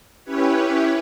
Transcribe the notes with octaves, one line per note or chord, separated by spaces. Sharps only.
C#4 E4 G4 B4 C#5